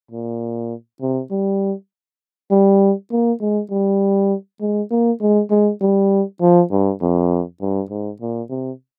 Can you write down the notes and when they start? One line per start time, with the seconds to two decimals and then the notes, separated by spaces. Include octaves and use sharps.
0.11 A#2
1.01 C3
1.31 G3
2.51 G3
3.11 A#3
3.41 G#3
3.71 G3
4.61 G#3
4.91 A#3
5.21 G#3
5.51 G#3
5.81 G3
6.41 F3
6.71 G2
7.01 F2
7.61 G2
7.90 G#2
8.21 A#2
8.50 C3